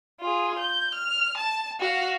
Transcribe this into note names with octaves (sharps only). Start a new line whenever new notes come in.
F4 G#4
G6
F6
A5
F#4 F5